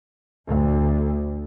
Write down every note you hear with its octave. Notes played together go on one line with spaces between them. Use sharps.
D2